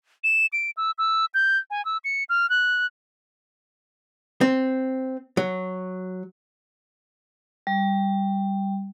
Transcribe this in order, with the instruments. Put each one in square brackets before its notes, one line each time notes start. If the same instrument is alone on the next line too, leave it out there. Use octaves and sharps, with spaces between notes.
[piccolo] E7
D7
E6
E6
G6
G#5
E6
C#7
F6
F#6
[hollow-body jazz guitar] C4
F#3
[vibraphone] G3